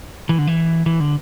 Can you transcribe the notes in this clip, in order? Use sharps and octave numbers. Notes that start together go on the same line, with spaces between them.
E3
D3
E3
E3
D3